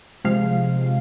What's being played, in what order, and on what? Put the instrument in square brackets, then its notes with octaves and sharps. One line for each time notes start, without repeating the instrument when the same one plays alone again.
[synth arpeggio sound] C3 F3 G#3 F5